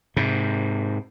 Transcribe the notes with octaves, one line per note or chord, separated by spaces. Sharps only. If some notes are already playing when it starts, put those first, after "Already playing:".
G#2 C3